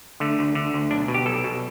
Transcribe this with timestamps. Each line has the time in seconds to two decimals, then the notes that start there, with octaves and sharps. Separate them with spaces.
0.20 D3 A3
0.39 D2
0.55 D3
0.74 D2
0.91 B1 D4
1.08 B2
1.14 G4
1.26 B1 A4
1.44 B2